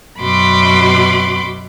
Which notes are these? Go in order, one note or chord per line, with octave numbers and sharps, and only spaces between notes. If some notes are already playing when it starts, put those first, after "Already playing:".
F#2 B2 F#4 B5 C6 D6